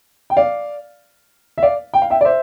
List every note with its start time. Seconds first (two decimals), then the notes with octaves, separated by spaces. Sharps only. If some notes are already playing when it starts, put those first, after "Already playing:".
0.30 G5
0.37 D5 F5
1.58 E5
1.63 D5 F5
1.94 G5
2.02 F5
2.10 E5 G5
2.21 D5
2.25 C5 E5